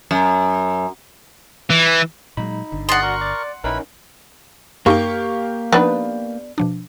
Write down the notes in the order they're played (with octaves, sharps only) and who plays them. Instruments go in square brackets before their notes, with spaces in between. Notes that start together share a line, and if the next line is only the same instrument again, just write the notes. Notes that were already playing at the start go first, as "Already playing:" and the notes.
[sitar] F#2
[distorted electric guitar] E3
[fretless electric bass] A#2 F#3 G#3 [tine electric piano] D#4 B5
[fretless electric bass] G1 D3
[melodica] G#4 D5 D#5 [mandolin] F#5 C6
[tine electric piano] F#4 D5 [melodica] A#4 C#6
[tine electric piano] D5
[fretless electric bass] A#1 [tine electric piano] C#4 D#4 A#4 [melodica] E4 B4 B5
[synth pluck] F#2 D#4 G5 [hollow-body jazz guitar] A#3 [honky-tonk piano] G4 F5 C#6
[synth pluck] F3 D#4 [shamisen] B3 D4 B4
[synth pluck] B2 F3 D4